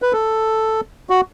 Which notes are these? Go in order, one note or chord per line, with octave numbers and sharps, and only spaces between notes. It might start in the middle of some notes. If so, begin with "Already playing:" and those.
B4
A4
F#4